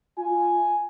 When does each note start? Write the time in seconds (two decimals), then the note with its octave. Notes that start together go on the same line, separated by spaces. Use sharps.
0.18 F4 G#5